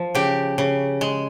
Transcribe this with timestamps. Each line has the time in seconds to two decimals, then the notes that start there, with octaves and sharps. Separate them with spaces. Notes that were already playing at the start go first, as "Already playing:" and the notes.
Already playing: F3
0.15 C#3 G4
0.58 C#3
1.01 G#3